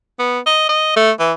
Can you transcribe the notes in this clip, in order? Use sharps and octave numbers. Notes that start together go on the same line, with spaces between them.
B3
D#5
D#5
A3
E3